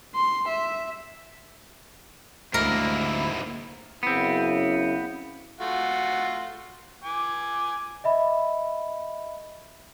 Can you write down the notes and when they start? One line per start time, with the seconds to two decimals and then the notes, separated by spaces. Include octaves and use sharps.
0.15 C6
0.49 E5
2.54 D2 G#2 A#3 E4 A#4
4.03 F#2 C#3 B3 C4 E4
5.60 A3 F4 F#4
7.04 G#5 D6
8.04 D#5 E5 B5